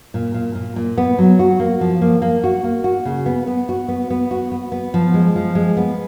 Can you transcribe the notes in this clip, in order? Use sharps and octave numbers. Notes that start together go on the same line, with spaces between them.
A#2
A#2
A#2
A#2
B3
F#3
F#4
A#3
F3
A#3
A#3
F#4
A#3
F#4
C#3
B3
B3
F#4
B3
B3
F#4
B3
B3
F3
G#3
F3
G#3
B3